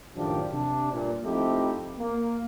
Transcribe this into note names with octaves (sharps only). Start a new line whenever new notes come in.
F#2 A2 D#3 F3 D4 G4
C3 D4
G2 A#2
F3 A3 C4 D#4 E4 G4
A#3